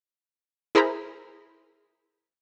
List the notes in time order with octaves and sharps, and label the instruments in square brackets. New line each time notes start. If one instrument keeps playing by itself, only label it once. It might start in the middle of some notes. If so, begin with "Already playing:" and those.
[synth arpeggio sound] E4 G#4 A#4 C5 A#5 B5